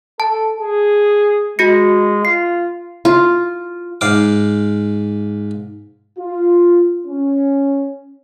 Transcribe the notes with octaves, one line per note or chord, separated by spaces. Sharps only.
A4 A5
G#4
G#3 F#4 A#6 C#7
F4 C7
F4
G#2 F5 D6
F4
C#4